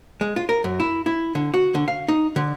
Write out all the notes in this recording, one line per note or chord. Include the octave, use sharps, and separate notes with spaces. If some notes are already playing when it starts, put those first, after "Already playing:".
G#3
F4
A#4
F#2
E4
E4
D3
F#4
D3
F5
D#4
D3